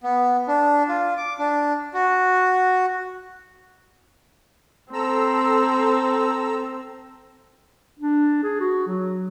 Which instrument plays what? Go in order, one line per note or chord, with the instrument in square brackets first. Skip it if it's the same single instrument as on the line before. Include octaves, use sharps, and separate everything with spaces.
[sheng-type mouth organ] B3
D4
F4
D6
D4
F#4
[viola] C4 [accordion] A4 A#5 E6
[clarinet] D4
G#4
F#4
F#3